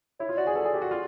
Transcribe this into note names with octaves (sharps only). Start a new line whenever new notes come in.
E4 C#5
F4
F#4 D5
G#4
A4
G#4
G4
F#4
F4